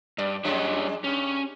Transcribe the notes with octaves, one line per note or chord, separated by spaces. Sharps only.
G2 D5
F2 G3 G#3 D4 C#5
G2 C#4